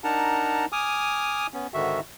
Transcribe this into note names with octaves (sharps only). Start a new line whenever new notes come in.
D4 D#4 A#4 F#5 A5 A#5
G#5 D6 D#6 F6
B3 C#4
G#2 D3 D#3 F#4 E5